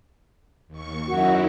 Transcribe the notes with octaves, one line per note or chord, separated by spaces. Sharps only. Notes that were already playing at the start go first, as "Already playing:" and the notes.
D#2 C#6
F#2 D#4 E4 F#4